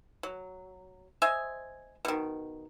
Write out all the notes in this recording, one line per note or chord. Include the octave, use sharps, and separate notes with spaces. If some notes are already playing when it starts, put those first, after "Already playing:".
F#3
C5 D#5 E5 G#5
B2 D#3